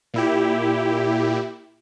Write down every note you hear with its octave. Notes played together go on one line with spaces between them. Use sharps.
A#2 E4 G4